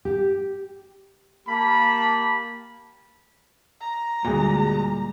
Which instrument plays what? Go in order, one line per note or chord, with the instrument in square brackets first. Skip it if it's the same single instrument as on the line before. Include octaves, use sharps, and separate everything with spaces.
[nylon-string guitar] G4
[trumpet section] A#3 G4 A5 B5
[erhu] A#5
[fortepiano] D2 G#4 [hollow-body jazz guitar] A#2 [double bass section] G3 G#3